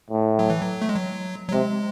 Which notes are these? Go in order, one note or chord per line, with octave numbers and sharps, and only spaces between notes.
A2
F#3
E3
F#3
A3
G#3
F#3
F#3
C3 G#3